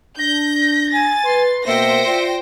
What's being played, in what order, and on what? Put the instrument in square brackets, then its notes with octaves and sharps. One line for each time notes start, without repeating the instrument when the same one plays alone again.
[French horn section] D4 [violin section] G6 [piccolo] A#6
[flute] G#5 [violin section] A6
[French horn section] B4 [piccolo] C6
[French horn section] B2 A#3 [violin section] C5 G5 A#6 [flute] E5 [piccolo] C#7
[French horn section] F4 D5